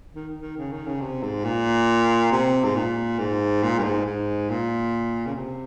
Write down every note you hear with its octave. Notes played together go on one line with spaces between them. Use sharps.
D#3
D#3
C#3
D#3
C#3
C3
G#2
A#2
C3
G#2
A#2
G#2
A#2
G2
G#2
G#2
A#2
C#3
C3